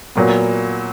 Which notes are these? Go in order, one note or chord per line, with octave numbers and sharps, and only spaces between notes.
A#2 F#3 B3